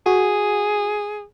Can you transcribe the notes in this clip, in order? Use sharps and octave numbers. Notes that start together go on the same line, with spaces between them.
F#4 G#4